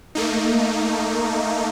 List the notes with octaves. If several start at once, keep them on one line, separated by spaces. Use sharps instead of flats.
A3 A#3 D#4